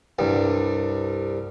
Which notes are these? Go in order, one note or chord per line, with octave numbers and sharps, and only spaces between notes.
C2 G2